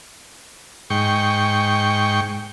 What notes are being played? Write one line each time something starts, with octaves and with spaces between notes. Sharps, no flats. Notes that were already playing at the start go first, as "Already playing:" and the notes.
G#2 G5 C#6